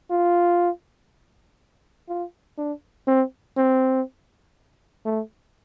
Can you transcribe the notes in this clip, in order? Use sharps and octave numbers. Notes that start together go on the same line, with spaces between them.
F4
F4
D4
C4
C4
A3